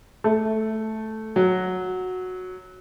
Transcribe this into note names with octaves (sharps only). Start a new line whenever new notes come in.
A3
F#3